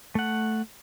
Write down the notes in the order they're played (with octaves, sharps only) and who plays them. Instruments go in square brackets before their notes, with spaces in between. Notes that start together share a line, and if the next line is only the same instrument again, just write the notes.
[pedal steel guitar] A3 F#5